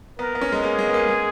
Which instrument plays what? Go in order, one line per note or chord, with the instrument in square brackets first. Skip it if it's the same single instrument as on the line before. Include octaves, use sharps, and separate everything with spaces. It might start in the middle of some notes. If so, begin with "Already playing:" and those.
[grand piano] B3 [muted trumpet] A#4
[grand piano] B3
C#4
G#3
[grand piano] A#3 [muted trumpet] G#4
[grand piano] G#3
B3
A#3
G#3